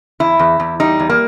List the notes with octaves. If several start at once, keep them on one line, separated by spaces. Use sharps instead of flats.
E2 E4
E2
E2
G3 D#4
E2
A#3